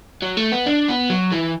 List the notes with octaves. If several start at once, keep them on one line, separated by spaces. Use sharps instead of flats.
F#3
A3
B3
D4
B3
F#3
E3